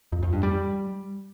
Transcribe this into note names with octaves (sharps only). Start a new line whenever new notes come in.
F2
F2
G2
G3